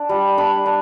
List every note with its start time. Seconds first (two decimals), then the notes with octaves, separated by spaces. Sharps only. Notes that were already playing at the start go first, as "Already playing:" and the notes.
Already playing: D4
0.09 G3
0.38 D4 B5
0.66 D4